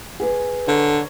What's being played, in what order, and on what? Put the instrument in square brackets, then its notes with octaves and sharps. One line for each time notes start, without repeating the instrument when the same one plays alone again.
[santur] G#4 B4 D6
[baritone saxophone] D3 [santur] C#5 A5 A#5